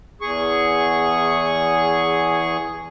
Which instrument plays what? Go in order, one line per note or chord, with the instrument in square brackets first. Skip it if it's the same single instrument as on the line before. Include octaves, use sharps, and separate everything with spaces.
[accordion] E2 G#4 C#6